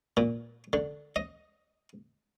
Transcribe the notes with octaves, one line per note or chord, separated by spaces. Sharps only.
A#2
D3
D#5